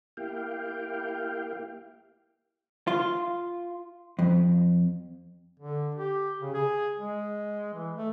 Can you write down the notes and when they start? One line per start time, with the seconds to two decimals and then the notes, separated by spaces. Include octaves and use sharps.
0.17 A#3 E4 G4 F5 G5
2.88 F4
4.19 F2
5.60 D3
5.95 G4
6.42 C#3
6.54 G#4
6.99 G#3
7.74 E3
7.97 A3